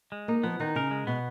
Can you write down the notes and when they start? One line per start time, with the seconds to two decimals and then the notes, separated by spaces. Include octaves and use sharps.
0.12 G#3
0.28 A#3 D#4
0.43 F3 B3
0.60 D#3 D#4
0.76 C#3 A#4
0.91 G#3
1.07 B2 B3